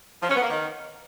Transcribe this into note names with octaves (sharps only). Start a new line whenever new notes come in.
F3
C#4
B3
A#3
D#3